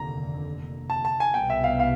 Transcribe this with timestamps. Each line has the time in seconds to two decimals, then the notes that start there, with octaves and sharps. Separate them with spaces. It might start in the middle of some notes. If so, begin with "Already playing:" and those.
Already playing: F1 D#2 D3 A#5
0.90 A5
1.05 A5
1.20 G#5
1.34 C2 B2 G3 B3 G5
1.50 E5
1.64 F5
1.80 F5